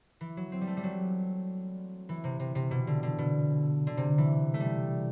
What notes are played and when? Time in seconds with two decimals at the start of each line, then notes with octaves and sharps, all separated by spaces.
0.21 E3
0.37 F#3
0.52 C4
0.61 G3
0.67 A3
0.77 G3
0.83 F#3
2.09 E3
2.24 C3
2.40 C3
2.55 C3
2.71 B2
2.87 D3
3.03 D3
3.18 B2
3.87 D3
3.97 C3
4.18 E3
4.54 A3
4.60 G3